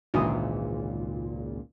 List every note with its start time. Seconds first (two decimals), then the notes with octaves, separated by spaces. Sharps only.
0.14 G#1 C#2 A#2 D3 E3 D#6